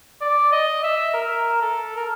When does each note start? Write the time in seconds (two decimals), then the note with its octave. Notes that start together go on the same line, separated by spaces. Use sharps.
0.21 D5
0.52 D#5
0.83 E5
1.14 A#4
1.61 A4
1.96 A#4